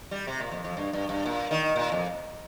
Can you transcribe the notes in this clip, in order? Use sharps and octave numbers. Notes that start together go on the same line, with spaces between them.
G3
C3
A#2
F2
F2
G2
G2
G2
A#2
D#3
A#2
F2